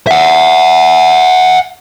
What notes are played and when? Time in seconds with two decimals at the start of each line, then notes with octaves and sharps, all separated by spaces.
0.07 E5 F#5